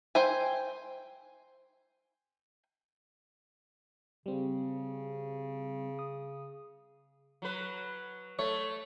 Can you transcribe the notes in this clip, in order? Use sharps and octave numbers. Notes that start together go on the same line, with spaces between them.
C5 G5 G#5
C#3 G3 C4
D#6
F#3 B4
A3 C#5